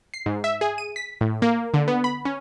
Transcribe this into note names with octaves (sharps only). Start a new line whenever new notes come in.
C7
G#2
E5
G#4
D#7
B6
A2
A#3
D3
B3
B5
C#4